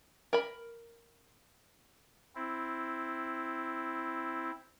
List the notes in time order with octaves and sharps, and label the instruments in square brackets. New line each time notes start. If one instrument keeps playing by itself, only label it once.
[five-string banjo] A#4 B5
[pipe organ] C4 E4